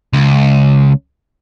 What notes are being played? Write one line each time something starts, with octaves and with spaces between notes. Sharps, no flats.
C#2